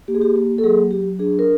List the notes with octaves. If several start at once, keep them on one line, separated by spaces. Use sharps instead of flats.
A#3 G4
G#4
G4
A#3 G4
A4
F#3 G#4
F#3 G4
D4 G#4
A#4